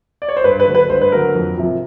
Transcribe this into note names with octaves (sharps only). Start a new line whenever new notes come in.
D5
C#5
C5
G2 B4
B4
D3 F#3 A3
B4
G2 C5
B4
D3 F#3 A3 A#4
F2
C3 F3